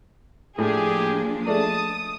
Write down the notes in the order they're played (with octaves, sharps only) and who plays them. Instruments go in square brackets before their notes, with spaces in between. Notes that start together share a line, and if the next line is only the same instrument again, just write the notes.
[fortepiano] A2 [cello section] F3 A#3 D4 [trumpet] G4 [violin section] G#4
[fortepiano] G#3 A3 D5 [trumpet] A5 [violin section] D#6